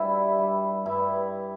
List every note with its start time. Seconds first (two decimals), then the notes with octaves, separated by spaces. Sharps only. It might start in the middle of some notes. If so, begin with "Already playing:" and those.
Already playing: G2 G3 D4 E4
0.39 G3
0.86 G2 E4